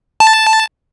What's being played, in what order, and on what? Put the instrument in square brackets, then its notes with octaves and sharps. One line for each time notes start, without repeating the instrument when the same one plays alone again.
[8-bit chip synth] A5